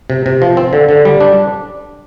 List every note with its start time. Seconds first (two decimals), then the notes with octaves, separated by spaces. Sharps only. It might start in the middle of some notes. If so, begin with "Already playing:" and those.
0.10 C3
0.26 C3
0.42 F3
0.57 C4
0.73 D3
0.89 D3
1.05 G3
1.20 D4